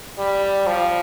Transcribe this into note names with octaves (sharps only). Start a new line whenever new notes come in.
G3
F3